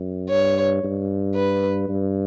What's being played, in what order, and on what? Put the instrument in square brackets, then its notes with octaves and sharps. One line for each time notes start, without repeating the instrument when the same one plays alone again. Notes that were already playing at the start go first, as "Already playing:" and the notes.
Already playing: [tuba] F#2
[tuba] G2 [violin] C#5
[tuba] G2
[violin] B4
[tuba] G2